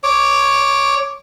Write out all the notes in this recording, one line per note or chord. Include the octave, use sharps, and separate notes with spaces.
C#5 D6